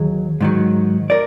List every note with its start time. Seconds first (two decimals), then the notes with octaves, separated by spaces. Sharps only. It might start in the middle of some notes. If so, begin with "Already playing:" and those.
Already playing: D#2 D#3 F#3 G#4
0.41 G#2 D#3 F#3
1.10 A#4 D5